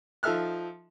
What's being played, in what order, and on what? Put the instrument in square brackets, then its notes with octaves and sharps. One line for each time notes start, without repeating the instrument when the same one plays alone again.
[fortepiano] F3 D#4 A4 E5 F6 F#6